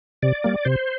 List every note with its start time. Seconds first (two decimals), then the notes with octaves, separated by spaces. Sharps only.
0.23 C3 D5
0.44 G3 A#3
0.65 C3 C5